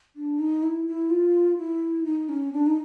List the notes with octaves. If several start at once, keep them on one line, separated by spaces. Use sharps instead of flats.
D4
D#4
E4
E4
F4
E4
D#4
C#4
D4
D#4